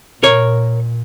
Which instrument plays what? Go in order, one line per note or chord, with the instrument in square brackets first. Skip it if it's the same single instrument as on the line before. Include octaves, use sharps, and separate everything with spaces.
[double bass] A#2 [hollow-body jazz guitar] A#4 C#5